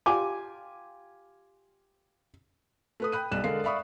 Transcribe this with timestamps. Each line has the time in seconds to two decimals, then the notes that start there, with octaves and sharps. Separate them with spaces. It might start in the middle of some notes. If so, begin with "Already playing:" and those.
0.06 F4 G4 G#5 D6
3.00 A3 B4 D#6
3.12 G5 B5 F#6 D#7
3.31 B1 G3 F#6 E7
3.44 D3 G#3 A#4 D5 F5 C7
3.64 D5 E5 F5 B5 C#6 D#6